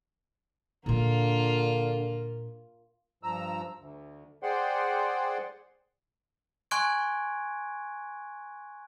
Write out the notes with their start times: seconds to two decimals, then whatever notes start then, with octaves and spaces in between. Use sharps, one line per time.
0.86 A#2 D3 A#3 D4 F4
3.23 G2 F3 A#5 E6
3.79 D2
4.43 G#4 C5 D5 F#5 G5 C6
6.71 G#5 C6 C#6 F#6 G#6 D7